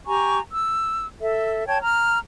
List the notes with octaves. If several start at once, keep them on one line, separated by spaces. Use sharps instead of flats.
G4 G#5 A#5 C#6
E6
A4 E5
C#5 G5 A5 G#6
A#5 F6